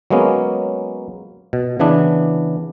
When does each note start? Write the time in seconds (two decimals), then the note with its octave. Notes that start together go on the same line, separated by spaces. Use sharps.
0.10 F#3 G#3 A#3 B3 C#4
1.53 B2
1.79 C#3 E3 B3 D4